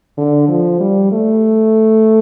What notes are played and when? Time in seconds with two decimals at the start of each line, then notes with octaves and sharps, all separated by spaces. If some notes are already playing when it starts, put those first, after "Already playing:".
0.18 D3
0.48 F3
0.80 G3
1.12 A3